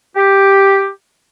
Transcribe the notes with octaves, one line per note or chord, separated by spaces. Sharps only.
G4